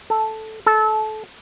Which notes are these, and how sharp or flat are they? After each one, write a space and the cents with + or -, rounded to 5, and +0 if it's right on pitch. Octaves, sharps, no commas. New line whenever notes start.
A4 -5
A4 -25